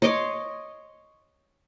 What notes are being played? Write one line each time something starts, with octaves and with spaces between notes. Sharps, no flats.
C#5 D#5 C6 D6